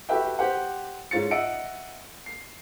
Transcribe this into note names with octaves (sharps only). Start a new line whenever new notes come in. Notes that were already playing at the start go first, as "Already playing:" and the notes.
F#4 G4 A4 B4 E5 G5
G4 C5 F#5
G#2 C#4 F4 A6 C#7
D#5 E5 F#5 E6 C#7 D7
C7